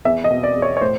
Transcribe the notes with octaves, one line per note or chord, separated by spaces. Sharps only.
E2 E5
D#5
B2
D5
E2
C#5
C#5
A2 C5